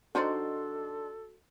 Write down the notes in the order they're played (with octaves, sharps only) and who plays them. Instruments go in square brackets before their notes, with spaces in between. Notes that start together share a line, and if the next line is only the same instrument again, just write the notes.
[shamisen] D#3 D#4 C5 [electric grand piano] D4 C6 [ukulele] F#4 D5 [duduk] A4